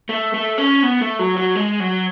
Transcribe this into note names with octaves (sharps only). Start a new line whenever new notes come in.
A3
A3
C#4
B3
A3
F#3
F#3
G#3
F#3